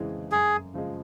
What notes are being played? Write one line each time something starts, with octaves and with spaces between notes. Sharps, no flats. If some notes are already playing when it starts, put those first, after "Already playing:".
Already playing: F2 C#3 E3 G#3 C4
F#2 G#4
C#3 F3 G#3